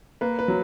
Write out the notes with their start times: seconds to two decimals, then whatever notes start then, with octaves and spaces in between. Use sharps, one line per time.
0.21 A#3 B4
0.39 B4
0.48 F#3